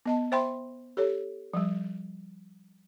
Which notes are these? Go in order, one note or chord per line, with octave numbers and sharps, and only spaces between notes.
B3 D#5 A5
C5 E5 G5 B5 C6
G4 A4 C#5
F3 G3